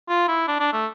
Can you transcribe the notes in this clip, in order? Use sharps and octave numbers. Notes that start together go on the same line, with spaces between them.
F4
E4
D4
D4
A3